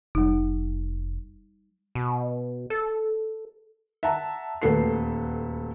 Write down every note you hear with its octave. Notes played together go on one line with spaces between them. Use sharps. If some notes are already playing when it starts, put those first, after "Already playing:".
F1 G3 D#4
B2
A4
E5 F#5 A5 A#5
D#1 D2 A4 B4 C7